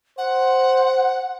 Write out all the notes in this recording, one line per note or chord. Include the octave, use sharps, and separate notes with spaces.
C5 F#5